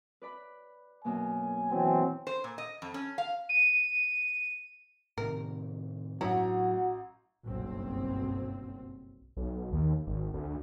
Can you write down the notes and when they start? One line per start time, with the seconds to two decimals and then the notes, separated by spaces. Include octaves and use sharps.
0.22 B4 D5 B5
1.05 F#2 B2 A#3 G#5
1.71 E3 F#3 C4
2.27 C5
2.44 A#2
2.58 D#5
2.82 F2
2.94 C#4
3.18 F5
3.49 D#7
5.18 A2 C3 D#3 A#4
6.21 A1 A2 F#3 E4 F#4 C#5 A#5
7.44 F#1 B1 G2 C4
9.37 B1
9.72 D#2
10.07 G#1
10.34 D2